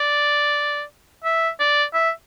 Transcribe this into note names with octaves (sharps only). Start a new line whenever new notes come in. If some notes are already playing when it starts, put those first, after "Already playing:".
Already playing: D5
E5
D5
E5